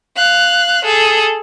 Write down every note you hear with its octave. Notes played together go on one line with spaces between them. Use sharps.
F5 F#6
G#4 A4